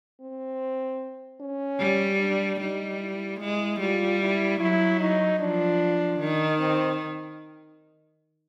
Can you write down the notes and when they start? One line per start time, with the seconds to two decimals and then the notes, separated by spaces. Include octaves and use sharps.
0.21 C4
1.41 C#4
1.80 G3
2.20 D4
2.60 G3 D#4
3.00 E4
3.40 G#3 E4
3.80 G3 F4
4.20 E4
4.60 F#3 E4
5.00 D#4
5.39 F3 D4
6.19 D#3
6.60 C4